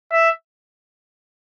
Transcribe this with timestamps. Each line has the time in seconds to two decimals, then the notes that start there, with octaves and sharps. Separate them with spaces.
0.12 E5